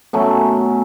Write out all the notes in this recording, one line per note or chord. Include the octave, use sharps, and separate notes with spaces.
B2 F#3 A3 C#4